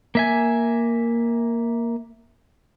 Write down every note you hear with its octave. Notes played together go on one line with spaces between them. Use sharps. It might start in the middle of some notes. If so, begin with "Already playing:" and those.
A#3 E5 G#5